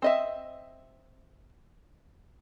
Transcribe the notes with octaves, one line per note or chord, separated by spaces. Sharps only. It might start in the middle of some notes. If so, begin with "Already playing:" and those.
C4 D#5 E5